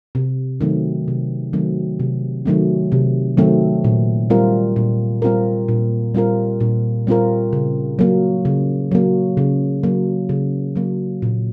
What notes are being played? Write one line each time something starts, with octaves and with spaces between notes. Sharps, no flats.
C3
D#3 F#3 A3 C4
C3
D#3 F#3 A3 C4
C3
D#3 F#3 A3 C4
C3
D#3 F#3 A3 C4
A#2
G3 C4 F4 A#4
A#2
G3 C4 F4 A#4
A#2
G3 C4 F4 A#4
A#2
G3 C4 F4 A#4
C#3
F#3 A#3
C#3
F#3 A#3
C#3
F#3 A#3
C#3
F#3 A#3
A#2